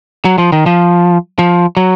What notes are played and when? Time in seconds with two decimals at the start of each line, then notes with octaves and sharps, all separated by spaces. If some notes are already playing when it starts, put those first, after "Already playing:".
0.25 F#3
0.38 F3
0.52 D#3
0.66 F3
1.39 F3
1.77 F#3